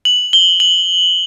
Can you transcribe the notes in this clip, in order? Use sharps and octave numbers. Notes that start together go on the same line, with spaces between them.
F#7
G7
F#7